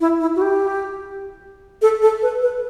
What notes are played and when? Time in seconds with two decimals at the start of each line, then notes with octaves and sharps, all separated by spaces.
0.01 E4
0.20 E4
0.36 F#4
0.41 G4
1.82 A4
2.02 A4
2.22 B4
2.42 B4